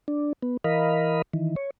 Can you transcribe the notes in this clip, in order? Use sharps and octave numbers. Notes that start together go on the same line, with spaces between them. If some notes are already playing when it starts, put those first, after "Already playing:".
D4
B3
E3 A#4 D#5 F5 B5
D#3 E3
C#5